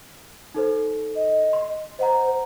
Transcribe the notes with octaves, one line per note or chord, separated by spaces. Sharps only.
D#4 A4 C5
D#5
C6
C5 D#5 F#5 A#5